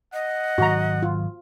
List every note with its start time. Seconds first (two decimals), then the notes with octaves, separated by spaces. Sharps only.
0.13 D#5 F#5
0.58 G#2 D#3 F#3 F#4 A#5
1.03 F4